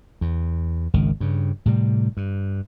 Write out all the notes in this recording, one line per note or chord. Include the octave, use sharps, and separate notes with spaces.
E2
G#1 C#2 D#3
G2 C#3
A2 C3 G3
G2